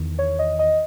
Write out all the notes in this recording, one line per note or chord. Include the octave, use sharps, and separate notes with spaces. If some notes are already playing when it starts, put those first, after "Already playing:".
Already playing: E2 D#3
C#5
D#5
D#5